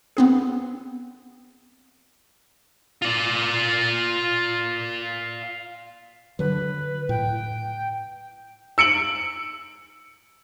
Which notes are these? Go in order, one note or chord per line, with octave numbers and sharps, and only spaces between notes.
B3 C4 G#4
F4 D5
D3 F#3 B4
A2 G5
E6 C#7 D7 F#7